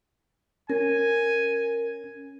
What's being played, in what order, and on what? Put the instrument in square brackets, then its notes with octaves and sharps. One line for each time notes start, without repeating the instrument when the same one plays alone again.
[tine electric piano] C#4 [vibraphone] A#4 [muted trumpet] G#5